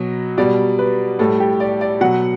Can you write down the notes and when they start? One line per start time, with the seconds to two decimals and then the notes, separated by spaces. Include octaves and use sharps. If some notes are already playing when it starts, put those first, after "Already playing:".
Already playing: B2 F#3
0.38 B2 G3 D5
0.79 B4
1.19 A2 G3 A4
1.40 G4
1.60 D5
1.81 D5
2.01 B2 F#3 F#5